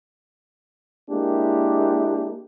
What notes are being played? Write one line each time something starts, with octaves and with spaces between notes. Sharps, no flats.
G#3 A#3 D4 E4 G4 A#4